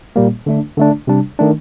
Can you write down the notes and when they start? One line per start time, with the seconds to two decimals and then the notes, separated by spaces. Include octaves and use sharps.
0.16 A#2 G3 A#3
0.46 D3 A3 D4
0.77 D3 A3 D4
1.07 C3 G3 D4
1.39 D#3 A3 D4